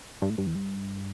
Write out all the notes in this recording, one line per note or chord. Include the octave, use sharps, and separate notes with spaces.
G2
A2
G2
E2
G2